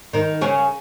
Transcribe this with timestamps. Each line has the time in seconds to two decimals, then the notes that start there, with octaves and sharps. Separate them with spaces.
0.13 D#3 D#4
0.41 C#3 C#4